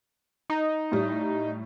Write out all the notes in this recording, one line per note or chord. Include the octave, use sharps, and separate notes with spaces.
D#4
A2 G3